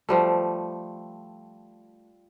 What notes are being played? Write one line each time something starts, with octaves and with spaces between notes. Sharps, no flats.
F3 G3 A3